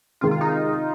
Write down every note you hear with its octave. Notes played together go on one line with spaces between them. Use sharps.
C3 D#3 G#3 F4
F4
D#4